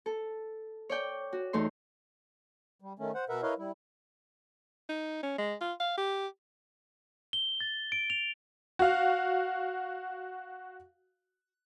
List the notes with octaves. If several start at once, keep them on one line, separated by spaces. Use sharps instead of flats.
A4
C#5 D5 G5
F#4
E2 A3 D#4 C6
G3
D#3 A3 C#4
C5 F#5
B2 A#4 B4 E5 F#5
E4 A#4 B4 C#5 D#5 F5
G3 E4
D#4
C#4
G#3
F4
F5
G4
G7
A6
D7
F7
F#4 F5